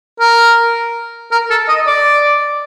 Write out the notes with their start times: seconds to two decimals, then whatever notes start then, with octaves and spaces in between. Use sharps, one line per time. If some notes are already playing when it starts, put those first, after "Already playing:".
0.20 A#4
1.32 A#4
1.50 A4
1.68 D#5
1.87 D5